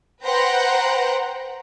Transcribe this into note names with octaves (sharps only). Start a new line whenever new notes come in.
B4 C5 F#5 G5 A#5